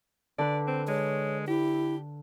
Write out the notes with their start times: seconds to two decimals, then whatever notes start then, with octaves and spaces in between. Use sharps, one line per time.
0.38 D3 B4 D5
0.68 C4
0.88 G#3 C#5
1.48 E4 G4